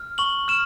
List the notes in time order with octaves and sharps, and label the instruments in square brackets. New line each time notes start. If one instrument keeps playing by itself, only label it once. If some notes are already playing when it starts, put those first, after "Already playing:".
Already playing: [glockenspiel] F6
C#6 F#7
F6 E7